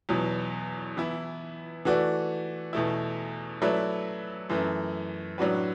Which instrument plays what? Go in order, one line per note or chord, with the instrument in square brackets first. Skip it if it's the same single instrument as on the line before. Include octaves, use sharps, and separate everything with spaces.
[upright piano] E2 B2 F#3 B3
E3 B3 E4
E3 A3 F#4 D5
E2 B2 A3 E4
F#3 A3 E4 B4 D5
F#2 E3 A3
A2 F#3 D4 F#4 B4